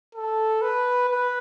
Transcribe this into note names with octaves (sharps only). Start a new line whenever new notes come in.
A4
B4
B4